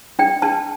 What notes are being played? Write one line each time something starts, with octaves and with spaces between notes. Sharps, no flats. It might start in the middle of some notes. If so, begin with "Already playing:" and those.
D4 G5
D4 A5